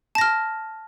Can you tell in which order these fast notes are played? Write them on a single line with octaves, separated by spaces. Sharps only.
A5 A#6 F6